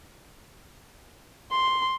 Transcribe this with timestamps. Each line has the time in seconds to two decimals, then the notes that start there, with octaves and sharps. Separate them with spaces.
1.51 C6